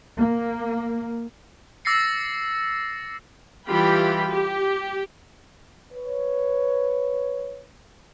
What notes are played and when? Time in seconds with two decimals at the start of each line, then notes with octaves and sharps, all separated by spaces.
0.17 A#3
1.85 D6 E6 A6 A#6 C7 C#7
3.66 E3 G3 F4 G4 G5 B5
4.30 G4
5.92 B4 C#5